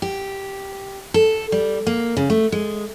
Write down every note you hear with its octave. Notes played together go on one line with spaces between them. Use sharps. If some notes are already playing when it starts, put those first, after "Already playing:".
G4
A4
G3
A#3
C#3
A3
G#3